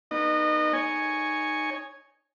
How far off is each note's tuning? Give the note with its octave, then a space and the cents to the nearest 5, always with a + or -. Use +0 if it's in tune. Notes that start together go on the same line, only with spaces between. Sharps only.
B3 -20 D#4 -15 D#5 -30
D#4 -15 C#5 +0 G#5 +0